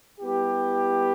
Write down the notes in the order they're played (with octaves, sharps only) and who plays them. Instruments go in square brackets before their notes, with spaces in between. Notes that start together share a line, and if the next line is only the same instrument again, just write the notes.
[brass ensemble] G3 B3 E4 G4